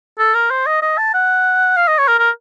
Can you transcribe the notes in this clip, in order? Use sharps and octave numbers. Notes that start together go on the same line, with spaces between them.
A4
A#4
C5
D#5
D#5
A5
F#5
F5
D#5
C#5
A#4
A#4